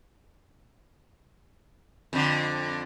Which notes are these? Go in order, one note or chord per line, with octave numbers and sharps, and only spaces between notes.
F2 D3